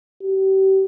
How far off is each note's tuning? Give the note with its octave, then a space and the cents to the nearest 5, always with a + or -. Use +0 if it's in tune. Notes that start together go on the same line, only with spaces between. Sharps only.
G4 -35